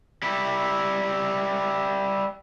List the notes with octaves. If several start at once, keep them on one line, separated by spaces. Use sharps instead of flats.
G3 E4